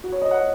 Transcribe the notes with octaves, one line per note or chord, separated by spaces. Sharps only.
F#4
C#5
D#5
F#5